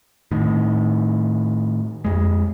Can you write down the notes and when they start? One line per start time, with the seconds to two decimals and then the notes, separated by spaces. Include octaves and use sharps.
0.31 A2 D#3
2.05 F2 G#3